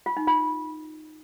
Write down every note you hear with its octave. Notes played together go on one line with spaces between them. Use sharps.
F4
D#4
F4